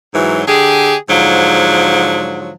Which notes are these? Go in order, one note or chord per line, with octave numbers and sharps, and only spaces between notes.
G#2 E3 F#3
D3 G4 G#4
G#2 D3 F3 F#3